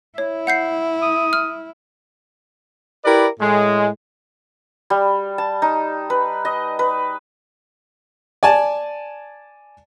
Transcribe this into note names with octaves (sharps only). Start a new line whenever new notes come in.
E4 C#5
F#5 G6 C7
D#6
F6
E4 G4 A#4 B4 D5
A2 G#3
G3
A5
D#4
B4
D#5
B4
D5 G#5 A5